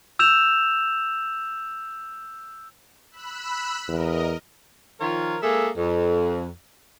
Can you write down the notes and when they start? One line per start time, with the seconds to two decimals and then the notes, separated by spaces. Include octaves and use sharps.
0.19 E6 G6 E7 F7
3.11 B5 E6 F#6
3.88 E2 A#4 D#5
5.00 D#3 F3 F4 A#4 C#5
5.42 G#3 A#3 G#4 A4 E5
5.76 F2